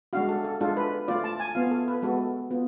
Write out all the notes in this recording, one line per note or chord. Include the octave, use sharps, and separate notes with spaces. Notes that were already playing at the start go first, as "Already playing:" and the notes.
G#3 D4 F#4 F5
A4
A4
G#3 D4 F4 A4
B4
A3 F4 D5
A5
G#5
B3 F4 F5
A4
B4
G#3 B3 F#4 A4
B3 F4